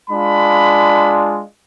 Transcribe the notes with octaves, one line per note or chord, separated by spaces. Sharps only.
G#3 D4 F4 B5